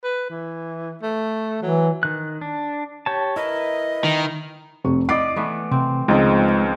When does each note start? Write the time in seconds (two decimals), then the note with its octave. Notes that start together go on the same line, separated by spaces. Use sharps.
0.04 B4
0.30 E3
1.03 A3
1.62 E3 F#3
2.03 D#3 F#6
2.41 D4
3.06 G4 C#5 A5
3.36 E4 A#4 B4 D#5
4.04 D#3
4.84 F1 C3 C#6
5.09 E4 D5 D#5 D6 C7 D7
5.36 E3 A3 B3
5.71 C3 C4
6.08 C#2 D#3 F3 G#3 C4 D#5